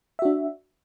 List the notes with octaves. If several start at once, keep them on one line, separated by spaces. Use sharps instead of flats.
D4 F#4 E5